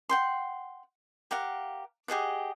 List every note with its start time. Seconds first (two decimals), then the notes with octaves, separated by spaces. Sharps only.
0.09 F#5 G5 C6
1.31 G4 A#4 F5 F#5
2.08 G4 G#4 D#5 F#5